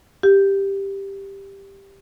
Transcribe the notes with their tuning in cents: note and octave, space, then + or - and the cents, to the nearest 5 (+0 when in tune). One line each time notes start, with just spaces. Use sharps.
G4 +5